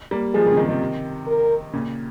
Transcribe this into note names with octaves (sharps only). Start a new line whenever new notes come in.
G3 A#3
F3 G#3 G#4
D#3 G3
C#3
C3 D#3
C3 D#3
A#4
A#2 C#3